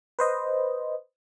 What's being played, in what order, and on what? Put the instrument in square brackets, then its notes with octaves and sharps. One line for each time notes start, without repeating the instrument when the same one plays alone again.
[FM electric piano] B4 C5 D#5